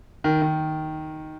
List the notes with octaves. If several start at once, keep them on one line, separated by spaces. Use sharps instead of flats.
D#3
D#3